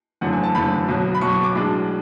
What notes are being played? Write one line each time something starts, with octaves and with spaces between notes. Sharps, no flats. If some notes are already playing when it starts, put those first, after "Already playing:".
F#1 E2 D3 F#3 A3 F#5
G#5
A5
F#1 E2 D3 F#3 A3 B5
B1 B2 F#3
B5
B1 B2 F#3 C#6
C#6
D6
B1 A2 G#3 D4